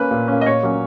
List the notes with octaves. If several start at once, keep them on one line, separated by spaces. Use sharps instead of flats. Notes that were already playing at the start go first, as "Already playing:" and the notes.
Already playing: A#3 C#4 B4
A#2
A#3 C#4
D#5
A#2 C#5
F#3 A#3 C#4